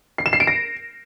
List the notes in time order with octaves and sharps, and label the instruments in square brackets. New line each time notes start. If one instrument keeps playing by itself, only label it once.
[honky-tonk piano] C7
E7
C7
D7
A#6